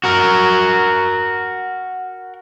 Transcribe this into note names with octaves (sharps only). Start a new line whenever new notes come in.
F#4 A#4